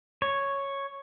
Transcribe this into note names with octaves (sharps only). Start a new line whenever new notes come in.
C#5